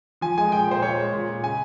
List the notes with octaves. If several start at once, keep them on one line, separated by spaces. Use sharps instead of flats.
F3 G#5
G#3 G#5
A#2 G5
A#2 C5
A#2 C#5
G#3
A#2
A#2
C#3 G#5